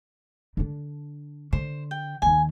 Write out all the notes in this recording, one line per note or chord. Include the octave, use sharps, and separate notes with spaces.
D3 D4
D3 C5
G5
D#2 D#3 G#5